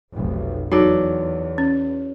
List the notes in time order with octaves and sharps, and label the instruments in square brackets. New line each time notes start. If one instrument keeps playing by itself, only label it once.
[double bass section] F1 B1
[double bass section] E2 [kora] F#3 A4 D5 [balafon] D#4
[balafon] C#4